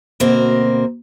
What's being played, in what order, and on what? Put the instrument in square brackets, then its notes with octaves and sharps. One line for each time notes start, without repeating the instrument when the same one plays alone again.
[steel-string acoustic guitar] D2 B2 A#3 C4 A#4 C5